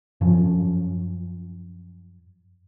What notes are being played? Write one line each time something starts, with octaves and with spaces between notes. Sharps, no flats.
F#2 F3 C#4